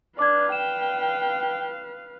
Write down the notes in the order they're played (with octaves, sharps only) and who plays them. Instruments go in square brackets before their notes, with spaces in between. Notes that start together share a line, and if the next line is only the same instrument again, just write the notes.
[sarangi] D4 [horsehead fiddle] B4 F5 [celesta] D6 G#6
[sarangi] G5 [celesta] E7